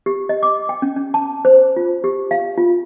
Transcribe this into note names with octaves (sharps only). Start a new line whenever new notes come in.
G4
D#5
D6
G5
C#4
C#4
A5
C5
F4
G4
F5
F4